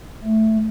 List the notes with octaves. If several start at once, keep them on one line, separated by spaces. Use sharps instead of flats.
A3